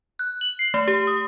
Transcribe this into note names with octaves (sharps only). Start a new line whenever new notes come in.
F#6
F#7
C7
A3
G4
D#6